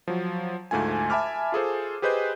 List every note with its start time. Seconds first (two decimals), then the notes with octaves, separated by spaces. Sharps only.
0.08 F3 F#3
0.71 D2 G#2 A3 F4 G#5
1.10 E5 G#5 A5 B5 D6 F6
1.52 F4 G#4 A4 C5
2.02 G4 G#4 B4 C5 D#5 G6